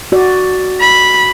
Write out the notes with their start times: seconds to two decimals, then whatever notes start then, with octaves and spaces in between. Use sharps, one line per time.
0.12 F#4 D5
0.80 B5